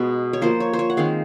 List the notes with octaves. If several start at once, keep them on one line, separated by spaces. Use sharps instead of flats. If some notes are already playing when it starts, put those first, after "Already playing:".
Already playing: B2 G#3 B3 B4
C#5
F3 A#3 C5
C#5
C5
C#5
F#5
D#3 G#3 C4 F5